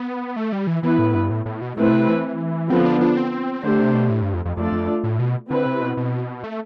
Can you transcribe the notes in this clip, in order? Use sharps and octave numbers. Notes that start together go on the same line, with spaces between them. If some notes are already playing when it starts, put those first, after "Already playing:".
Already playing: B3
A3
G3
E3
E3 B3 E4 B4
A2
G2
A2
A2
B2
B2 A3 C4 E4 B4
C3
E3
D3 F3 B3 C4 F4
D4
D4
C4
D3 A3 D4 G4 C5
C3
B2
A2
G2
F2
F2
F2 A3 D4 F4 A4 D5
F2
A2
B2
D3 C4 E4 B4
C3
B2
B2
A3